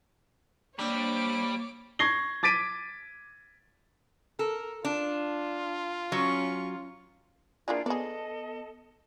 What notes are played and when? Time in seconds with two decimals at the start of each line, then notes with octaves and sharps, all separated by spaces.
0.79 C3 G3 A#3 C4 D4 G4 C#5 D6
1.99 C#6 G#6 A#6 C7 G7
2.43 D6 A6 B6 D7 D#7
4.39 A4 A#4
4.85 D4 F4
6.12 F#3 C#4 C#6
7.68 A#3 D4 E4 F4 G#4 D5
7.86 B3 G#4 A4 D5 D#5